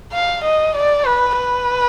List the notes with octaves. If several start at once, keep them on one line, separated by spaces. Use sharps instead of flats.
F5
D#5
D5
B4
B4